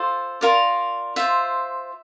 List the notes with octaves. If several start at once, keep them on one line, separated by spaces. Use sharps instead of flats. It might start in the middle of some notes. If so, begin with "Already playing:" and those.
Already playing: F4 A4 C5
F4 A#4 D5
F4 C5 E5